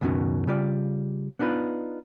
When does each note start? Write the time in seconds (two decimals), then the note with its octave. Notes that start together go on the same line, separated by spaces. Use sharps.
0.01 C#2 F#2 B2 D#3 C#4 F#4
0.47 C#3 G3 F4 D5
1.39 B3 D4 D#4 F4 B4